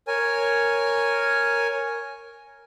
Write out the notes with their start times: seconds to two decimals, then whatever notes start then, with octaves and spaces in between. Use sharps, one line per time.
0.08 A#4 C#5 G#5